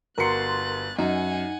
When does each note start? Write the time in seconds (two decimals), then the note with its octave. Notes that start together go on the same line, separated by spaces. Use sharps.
0.18 G1 F#4 A#4 C6 F#6 A6 C#7
0.99 F#2 D#4 F#5 G#5